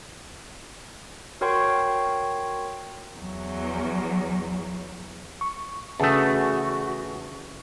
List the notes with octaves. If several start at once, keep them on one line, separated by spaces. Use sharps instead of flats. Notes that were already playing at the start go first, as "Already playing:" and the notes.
F#4 A#4 C#5 G5 C6 C#6
E2 F#3
C#6
E2 C#3 E3 A3 D4 F#4 A5 D#6